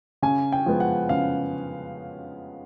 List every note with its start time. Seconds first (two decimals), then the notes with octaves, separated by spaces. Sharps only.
0.22 C#3 G#5
0.52 G5
0.66 F3 G#3 B3
0.80 F#5
1.09 C#3 F5